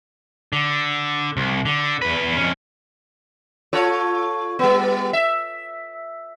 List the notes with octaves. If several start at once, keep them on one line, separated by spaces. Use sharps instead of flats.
D3
C2
D3
E2 B4
F2 C#4
F4 A4 C#5
G3 B3
E5